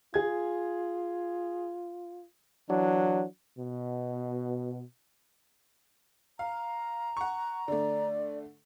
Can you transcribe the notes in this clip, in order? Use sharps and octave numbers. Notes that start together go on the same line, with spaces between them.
F4 G#4 G#6
E3 F#3 D4
B2
F5 A#5
F#5 C#6
D3 A3 D5